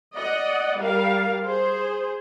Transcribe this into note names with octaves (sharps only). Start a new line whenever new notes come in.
D5 D#5 F#5
G3 A#4 F5
G#4 C5